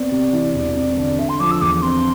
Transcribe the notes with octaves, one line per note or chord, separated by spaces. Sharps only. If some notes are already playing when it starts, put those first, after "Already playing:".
Already playing: B3 C4 D5
C3
E3
E1
C4
D3
D3 E5
C6
F3 D6
E6
E2 D6
C4 C6